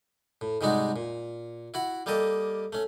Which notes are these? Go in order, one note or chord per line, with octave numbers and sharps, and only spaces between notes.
A2
G#2 C3 G3 G#3 D#4 F#4
A#2
E4 F#4 F#5
G3 A#3 G4 A4 D#5
A3 C#4